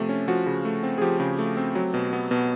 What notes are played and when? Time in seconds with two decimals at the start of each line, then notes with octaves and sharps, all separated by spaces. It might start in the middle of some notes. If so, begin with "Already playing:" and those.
Already playing: C3 F3 A3
0.09 C#4
0.28 F3 F#4
0.46 C#3
0.65 A3
0.83 C4
0.98 G#4
1.01 F3 G4
1.20 C#3
1.39 A3
1.57 C4
1.75 F#3
1.94 B2
2.13 B3
2.31 B2